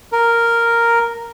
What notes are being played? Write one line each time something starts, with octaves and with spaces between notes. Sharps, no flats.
A#4